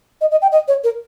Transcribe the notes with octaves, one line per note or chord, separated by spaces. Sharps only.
D#5
D#5
G5
D#5
C#5
A#4